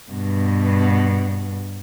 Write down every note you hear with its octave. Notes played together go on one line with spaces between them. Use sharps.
G2 B2